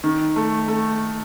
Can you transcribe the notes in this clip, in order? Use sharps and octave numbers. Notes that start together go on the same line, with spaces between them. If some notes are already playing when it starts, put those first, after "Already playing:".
D#3
A3
A3